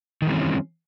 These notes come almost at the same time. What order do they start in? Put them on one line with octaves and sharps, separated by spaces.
D#3 E3 G3 C4 C#4